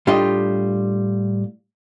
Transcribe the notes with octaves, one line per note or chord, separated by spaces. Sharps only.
A2 G3 D4 F4 G4 D#5